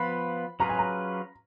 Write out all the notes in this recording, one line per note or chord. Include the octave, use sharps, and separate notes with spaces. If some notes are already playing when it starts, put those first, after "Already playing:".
Already playing: F3 B3 F4 B4 B5
F#3 C#4 F4 G#4 B4 A#5
G#5
A#5